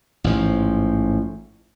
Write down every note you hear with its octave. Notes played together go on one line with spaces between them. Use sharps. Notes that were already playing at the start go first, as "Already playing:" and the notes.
A1 G#2 F3